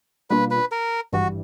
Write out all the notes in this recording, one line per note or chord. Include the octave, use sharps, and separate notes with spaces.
B2 G3 A#3 D4 F4 B4
B4
A#4
G#1 G2 E3 G3 F#4